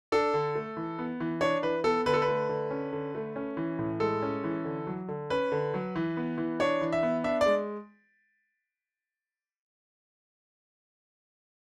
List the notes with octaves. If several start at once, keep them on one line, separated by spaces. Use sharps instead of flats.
D4 A4
D3
A3
E3
B3
E3
D4 C#5
E3 B4
B3 A4
D3 B4
A4
B4
A3
D3
C#4
D3
A3
C#4
E3
A2
G#3 A4
C#4
E3
D3
F#3
D3
C#4 B4
D3
F#3
E3
B3
E3
D4 C#5
E3
E5
B3
D4 E5
G#3 D5